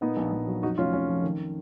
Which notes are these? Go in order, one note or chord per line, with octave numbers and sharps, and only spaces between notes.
A#2 B3 D#4
A#1
A#1
F#3
F2 D#4 F#4
F1 C#4 F4
F1 C#4
F3
D#3